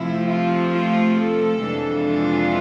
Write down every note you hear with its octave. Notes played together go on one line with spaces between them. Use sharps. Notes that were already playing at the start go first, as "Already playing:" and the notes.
Already playing: C3 F3 A3 C4 E4
F4
F4
A4
F2 C3 E3 G#3 D4
F4